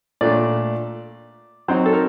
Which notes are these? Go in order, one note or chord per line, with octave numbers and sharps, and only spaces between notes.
A#2 A3 D4 D5
F#3 C4 D#4 C5
A4
A#4